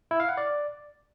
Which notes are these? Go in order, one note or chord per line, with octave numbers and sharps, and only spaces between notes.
E4
F5
F#5
D5